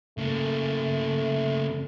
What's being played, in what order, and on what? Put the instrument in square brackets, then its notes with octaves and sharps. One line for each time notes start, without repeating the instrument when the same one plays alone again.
[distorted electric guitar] C#3 A#3 [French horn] A3